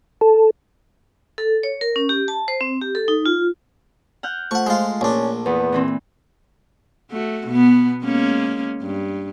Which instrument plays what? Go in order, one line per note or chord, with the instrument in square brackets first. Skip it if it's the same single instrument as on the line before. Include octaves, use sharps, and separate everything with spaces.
[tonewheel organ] A4
[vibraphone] A4
C#5
A#4
C#4
G4
A5
C5
C4
G4
A4
D#4
F4
[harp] F#5 F6 G6
[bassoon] F3 [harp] A3 [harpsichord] F#5 C#6
[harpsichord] G#3 F4
[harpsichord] A#1 D4 [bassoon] C#4
[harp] E2 [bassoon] B3
[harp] A#2 E3 C4
[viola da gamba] A3 F#4
B2 B3
G#3 A#3 C#4
G2